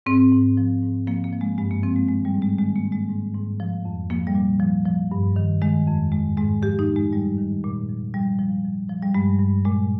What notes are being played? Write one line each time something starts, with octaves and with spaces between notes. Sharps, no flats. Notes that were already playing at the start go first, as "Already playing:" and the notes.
G#2 C4
G#2
F3
G#2
F3 A#3
A#3
F3
G#3
G2 G#3
A#3
F3 C4
G#3
D#3 G#3
G3
G#2
G#3
D#3 G#3
A#3
G#2
G#3
G#2
G#2
F3
F2
F3 A#3
G3
A#2
F3
F3
G2
D#3
D#3 G#3
F2
G#2 G#3
G#2 G#3
F3 G4
D#4
A#2
G#3
G2 G3
D#3
A#2
F3
F3 G3
F3
F3
F3
G3
G2 G#3
G2
A#2 G#3